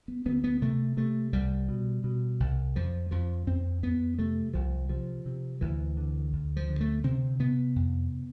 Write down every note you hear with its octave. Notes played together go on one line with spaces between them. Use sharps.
B3
D2 B3
B3
C3 A3
C3 A3
C2 G3
B2
B2
C2
F2 F3
F2 F3
F2 C4
F2 B3
C3 A3
C2 F3
C3 F3
C3
D2 E3
D3
D2
F3
D3
A3
C3 C4
C3 B3
F2